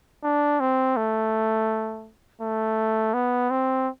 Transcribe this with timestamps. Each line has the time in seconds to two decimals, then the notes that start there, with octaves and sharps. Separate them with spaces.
0.24 D4
0.60 C4
0.97 A3
2.42 A3
3.14 B3
3.51 C4